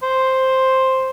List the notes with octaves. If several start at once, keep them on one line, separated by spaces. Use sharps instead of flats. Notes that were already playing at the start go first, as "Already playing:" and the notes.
C5